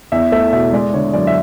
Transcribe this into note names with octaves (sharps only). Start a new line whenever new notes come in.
E2 E5
A3 E5
B2 E5
G#3 D5
D3 C#5
F#2 D5
E5